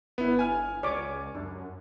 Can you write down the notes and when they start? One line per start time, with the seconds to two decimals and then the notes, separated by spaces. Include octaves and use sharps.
0.18 G1 B3 E4
0.39 G#5 F6
0.83 C#2 C#5 D5 D6
1.35 F#2 D4